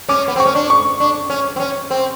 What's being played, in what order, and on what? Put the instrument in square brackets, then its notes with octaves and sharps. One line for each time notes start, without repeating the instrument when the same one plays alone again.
[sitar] C#4 [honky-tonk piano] D6
[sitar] B3
C4
[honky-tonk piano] C#6
[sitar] C#4
D4
[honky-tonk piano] C#6
[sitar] D4
C#4
C4
C#4
C4